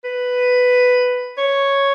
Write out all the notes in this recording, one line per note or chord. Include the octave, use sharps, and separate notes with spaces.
B4
C#5